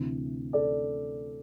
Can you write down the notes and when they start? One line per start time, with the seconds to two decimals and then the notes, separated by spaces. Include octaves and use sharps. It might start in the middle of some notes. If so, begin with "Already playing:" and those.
Already playing: D2 C3 E3
0.53 A4 D5